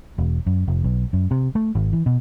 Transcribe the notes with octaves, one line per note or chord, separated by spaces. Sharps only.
E1
F#2
F1
B1
F#2
C3
A3
G#1
E3
B2